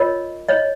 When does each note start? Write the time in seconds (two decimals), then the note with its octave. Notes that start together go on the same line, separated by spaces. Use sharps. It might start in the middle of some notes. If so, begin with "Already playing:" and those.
Already playing: F4 A#4 C#5 D#5
0.48 C#5 D#5